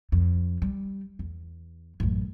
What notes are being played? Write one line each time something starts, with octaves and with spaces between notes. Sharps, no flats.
F2
G3
E2
A1 F#2